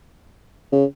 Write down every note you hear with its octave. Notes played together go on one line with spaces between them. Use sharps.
C#3